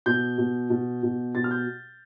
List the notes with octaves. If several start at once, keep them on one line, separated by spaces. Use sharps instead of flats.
B2 G6
B2
B2
B2
B2 A6
F6
G6